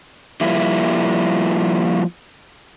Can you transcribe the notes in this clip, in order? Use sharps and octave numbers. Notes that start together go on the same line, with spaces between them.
F3 G3 A#3 E4